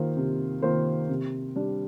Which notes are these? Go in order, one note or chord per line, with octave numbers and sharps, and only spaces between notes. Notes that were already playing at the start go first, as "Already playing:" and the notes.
Already playing: D#3 A#3 F4 C5
C3
D#3 A#3 F4 C5
C3
G3 D4